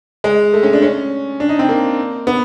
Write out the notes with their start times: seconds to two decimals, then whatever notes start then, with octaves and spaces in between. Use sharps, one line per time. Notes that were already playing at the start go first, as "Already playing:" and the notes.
0.24 G#3
0.53 A3
0.63 C#4
0.73 D4
0.82 C#4
1.40 D4
1.49 D#4
1.59 C4
1.69 A#3
2.27 B3